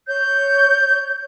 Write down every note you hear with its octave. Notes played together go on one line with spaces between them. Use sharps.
C#5 G6